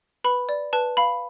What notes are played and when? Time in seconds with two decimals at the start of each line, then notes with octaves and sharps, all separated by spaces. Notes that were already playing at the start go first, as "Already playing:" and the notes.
0.24 B4 B5
0.49 D5
0.73 B4 A5
0.97 F5 B5